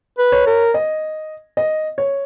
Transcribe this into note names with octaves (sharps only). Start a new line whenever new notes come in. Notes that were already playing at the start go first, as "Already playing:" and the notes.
B4
C#5
A#4
D#5
D#5
C#5